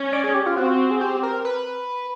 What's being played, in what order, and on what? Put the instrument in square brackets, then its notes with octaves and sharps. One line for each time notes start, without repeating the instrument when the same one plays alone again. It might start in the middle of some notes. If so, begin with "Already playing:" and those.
Already playing: [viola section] C#4
[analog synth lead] D5
G#4
G4
F4
[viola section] C4 [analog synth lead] F#4
[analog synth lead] G#4
G4
A#4
B4